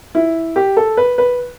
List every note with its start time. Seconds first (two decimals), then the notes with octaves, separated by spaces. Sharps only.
0.15 E4
0.56 G4
0.77 A4
0.97 B4
1.18 B4